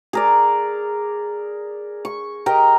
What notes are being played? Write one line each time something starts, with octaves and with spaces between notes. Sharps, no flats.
G#4 A#4 D5
C#6
G4 A#4 D#5 G5